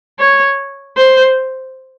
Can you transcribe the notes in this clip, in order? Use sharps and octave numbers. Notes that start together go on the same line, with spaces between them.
C#5
C5